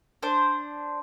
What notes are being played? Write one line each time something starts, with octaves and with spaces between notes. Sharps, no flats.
D4 C5